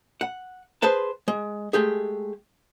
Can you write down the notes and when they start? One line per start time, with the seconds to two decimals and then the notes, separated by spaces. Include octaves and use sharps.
0.21 F#5
0.82 G#4 B4 C5 A5
1.28 G#3
1.73 G#3 A3 G4 G#4